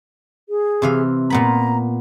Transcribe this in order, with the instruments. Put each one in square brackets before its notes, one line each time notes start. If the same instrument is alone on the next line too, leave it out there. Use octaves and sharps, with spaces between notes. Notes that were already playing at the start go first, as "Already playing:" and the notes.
[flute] G#4
[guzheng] C3 E3 F5
[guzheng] A#2 B3 B5 [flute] A#5